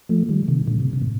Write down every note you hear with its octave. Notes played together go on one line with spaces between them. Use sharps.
F3 A3
D#3 G3
C3 D#3
A#2 D3
C3
C3
A2